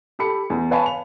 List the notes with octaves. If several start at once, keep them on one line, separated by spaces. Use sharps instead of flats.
G4 A4 B5 C#7
E2
B4 C#5 F5 G#5 A5 B5
F7